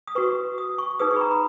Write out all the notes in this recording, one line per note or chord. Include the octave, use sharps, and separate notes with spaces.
D#6
F#4 B4 C#6
D#6
C#6
D#4 G#4 B4 D#6
C#6
B5
A#5
B5